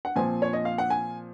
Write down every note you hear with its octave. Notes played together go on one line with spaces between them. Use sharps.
F#5
A#2 F3 C4 G#5
C#5
D#5
F5
F#5
G#5